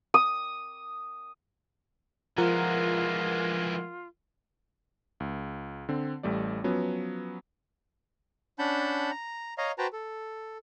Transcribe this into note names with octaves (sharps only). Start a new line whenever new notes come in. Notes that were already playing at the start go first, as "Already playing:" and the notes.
D#6
E3 F3 G#3 F4 A#4 F#5
C#2
D3 C4
A1 G3 A3 D5
F3 F#3 B3 C#4 B4
C#4 D4 F#5 A5 B5 G6
A#5
C#5 D#5 F5 A#5
F#4 B4 C5 G5 A5 A#5
A4